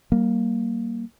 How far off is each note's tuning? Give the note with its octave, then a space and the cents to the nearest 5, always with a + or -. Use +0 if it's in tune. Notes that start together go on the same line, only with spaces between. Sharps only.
G3 -35 A#3 +0